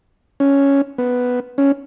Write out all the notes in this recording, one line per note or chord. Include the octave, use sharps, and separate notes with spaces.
C#4
B3
C#4